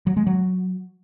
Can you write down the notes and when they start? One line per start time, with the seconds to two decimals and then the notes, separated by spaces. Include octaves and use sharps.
0.07 F#3
0.17 G#3
0.27 F#3